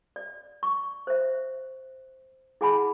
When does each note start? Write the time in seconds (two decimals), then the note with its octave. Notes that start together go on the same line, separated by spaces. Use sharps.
0.16 D5
0.63 C#6
1.07 C5 E5
2.61 E4 G#4 F#5 G#5 A5 B5